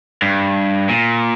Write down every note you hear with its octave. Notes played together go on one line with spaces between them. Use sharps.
G2
A#2